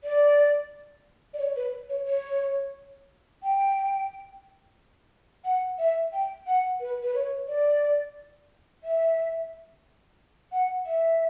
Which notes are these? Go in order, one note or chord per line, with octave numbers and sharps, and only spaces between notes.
D5
D5
C#5
B4
C#5
C#5
G5
F#5
E5
G5
F#5
B4
B4
C#5
D5
E5
F#5
E5